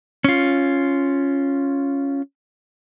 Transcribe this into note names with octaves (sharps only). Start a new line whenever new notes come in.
C#4 F4